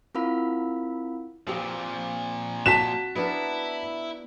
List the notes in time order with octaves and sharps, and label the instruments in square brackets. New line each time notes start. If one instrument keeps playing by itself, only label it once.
[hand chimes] C4 E4 F4 A#4 F5 B5
[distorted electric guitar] A#2 F3 [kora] C4 G4 G#4
[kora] F#4 G5 [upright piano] A5 B6 E7
[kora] B3 D4 A#4 [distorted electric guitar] E4